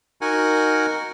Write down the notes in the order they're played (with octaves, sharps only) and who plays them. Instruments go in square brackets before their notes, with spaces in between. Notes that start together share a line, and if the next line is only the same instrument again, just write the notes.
[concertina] D#4 F#4 A#4 F#5 G#5